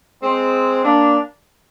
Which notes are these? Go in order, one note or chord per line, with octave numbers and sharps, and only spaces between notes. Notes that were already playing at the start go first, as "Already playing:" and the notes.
G#3 C4
A#3 D4